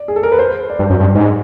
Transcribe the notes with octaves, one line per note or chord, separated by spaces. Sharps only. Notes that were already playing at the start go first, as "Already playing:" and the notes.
Already playing: D5
G#4
A4
A#4
B4
C5
D5
G2
F#2
G2
G#2